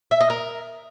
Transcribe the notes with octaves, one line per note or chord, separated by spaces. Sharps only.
E5
D#5
A#4